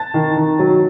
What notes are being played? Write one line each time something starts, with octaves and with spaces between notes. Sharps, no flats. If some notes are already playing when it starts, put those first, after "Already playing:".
Already playing: A5 A6
D#3
D#3
F#3